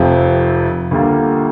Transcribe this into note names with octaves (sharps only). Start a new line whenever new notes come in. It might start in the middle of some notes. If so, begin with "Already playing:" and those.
Already playing: F1 F2 C3 F3
D2 D3 G3 A#3 F4